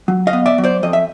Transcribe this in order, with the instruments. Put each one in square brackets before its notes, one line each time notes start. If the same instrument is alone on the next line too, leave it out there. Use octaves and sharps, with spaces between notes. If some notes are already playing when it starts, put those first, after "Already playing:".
[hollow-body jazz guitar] F#3
D#5 F5
B3
D5 E5
F#3
C5 D5
F2 D#5
E5